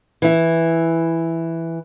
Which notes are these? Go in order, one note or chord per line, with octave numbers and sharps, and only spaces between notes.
E3 E4